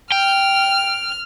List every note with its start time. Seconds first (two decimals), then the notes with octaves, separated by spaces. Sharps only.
0.12 G5 F6